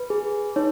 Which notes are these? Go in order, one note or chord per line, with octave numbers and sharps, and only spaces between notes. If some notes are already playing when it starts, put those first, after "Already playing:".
Already playing: B4
G#4
D#4 C#5